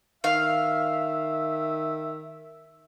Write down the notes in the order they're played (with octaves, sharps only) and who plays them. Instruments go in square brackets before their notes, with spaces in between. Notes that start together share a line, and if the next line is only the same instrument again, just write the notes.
[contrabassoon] D#3 [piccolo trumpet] E5 [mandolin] F5